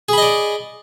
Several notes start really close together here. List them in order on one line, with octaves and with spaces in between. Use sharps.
G#4 B5 D#5 D5